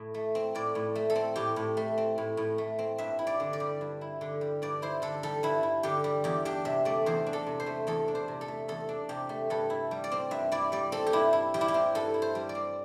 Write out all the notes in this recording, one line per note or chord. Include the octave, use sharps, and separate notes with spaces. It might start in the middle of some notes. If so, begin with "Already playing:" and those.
Already playing: A2
A3
C4
A2 D5
A2
A3
A4
C4
A2 G4
A2
A3
C4
A2
A2
A3
C4
G2 E5
E4
D5
D3
D5
G3
G2
E4
D3
G3
G2 D5
E4 C5
D3 A4
G3 A4
G2 E4
E4
D3 G4
G3
E2 G4
D4 G4
C3 E5
A3 D5
E2 C5
D4
A4
C3
C5
A3
E2 A4
D4
C5
C3
A4
A3
E2 A4
D4
C3 G4
A3
G2 A4
E4
G3
D5
C4
G2 E5
E4 D5
G3 D5
C4 A4
G4
G2 E4
E4
G3 G4
E4
G4
C4
G2 A4
E4
C5
G3
D5
C4